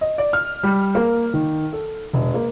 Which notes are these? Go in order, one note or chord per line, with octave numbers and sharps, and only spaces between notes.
D#5
D5
F6
G3
A#3
D#3
A4
E1
A#3